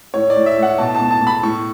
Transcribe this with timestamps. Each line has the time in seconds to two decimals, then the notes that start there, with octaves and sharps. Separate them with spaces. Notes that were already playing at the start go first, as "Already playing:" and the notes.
0.14 A2 C#5
0.30 D5
0.35 A2
0.46 E5
0.57 A2
0.63 F#5
0.78 B2 A5
0.95 A5
1.00 B2
1.11 A5
1.21 B2
1.27 B5
1.43 A2 C#6